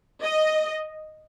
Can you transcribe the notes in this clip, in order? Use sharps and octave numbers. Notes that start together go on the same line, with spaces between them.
D#5